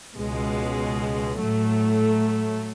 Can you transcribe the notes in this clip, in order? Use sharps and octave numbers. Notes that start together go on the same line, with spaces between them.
C#2 B2 G#3
A2 F#3 A3